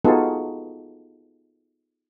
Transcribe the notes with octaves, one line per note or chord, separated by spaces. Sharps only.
B3 D#4 F4 F#4 G#4 A4